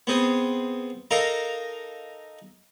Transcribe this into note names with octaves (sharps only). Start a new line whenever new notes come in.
B3 C4 G#4
D#4 A4 A#4 F5